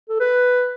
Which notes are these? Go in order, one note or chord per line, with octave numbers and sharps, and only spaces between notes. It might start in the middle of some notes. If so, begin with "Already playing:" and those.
A4
B4